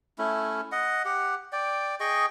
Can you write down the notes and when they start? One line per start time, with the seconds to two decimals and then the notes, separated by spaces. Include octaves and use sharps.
0.18 A3 C#4 E4
0.72 D#5 F#5
1.05 G4 F#5
1.52 D5 G5
2.00 G#4 D#5 G5 C#6